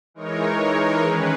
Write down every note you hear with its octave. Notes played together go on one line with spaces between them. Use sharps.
E3 G#3 D#4 A#4 C#5
D#3 G#3 C#4 G#4 B4